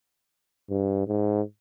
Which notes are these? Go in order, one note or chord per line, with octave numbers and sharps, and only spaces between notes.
G2
G#2